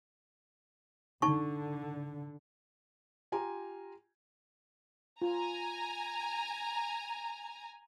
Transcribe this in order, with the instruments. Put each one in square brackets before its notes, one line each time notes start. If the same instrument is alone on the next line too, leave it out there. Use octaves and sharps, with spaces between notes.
[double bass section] D3 [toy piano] D#4 A5 C#6
[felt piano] F4 G4 G#5 A#5
[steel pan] F4 [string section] G#5 A#5